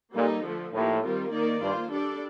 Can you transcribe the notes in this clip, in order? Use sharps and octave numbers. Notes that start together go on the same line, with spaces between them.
A#2 G3 A#3 D#4 A4
D3 F3 A3
A2 F3 A#3 D#4 G4
D#3 G3 C4 F4 A#4
D#3 A#3 D#4 A#4 D5
G2 A#3 F4 C5
G3 D4 A4 D5